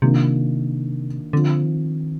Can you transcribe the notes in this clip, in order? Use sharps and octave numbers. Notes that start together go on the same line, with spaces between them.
C3 D#3 A#3 D4 F4
D3 F3 C4 F4
D#3